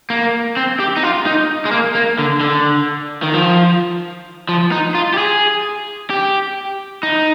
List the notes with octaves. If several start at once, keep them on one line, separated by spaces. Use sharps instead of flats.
A#3
C4
G4
D#4
F4
D#4
G#3
A#3
A#3
D3
D3
D#3
F3
F3
D#4
F4
G4
G#4
G4
D#4